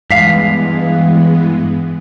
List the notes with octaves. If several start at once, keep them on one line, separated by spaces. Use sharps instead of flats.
G2 E3 G#3 B3 F5 B6 C7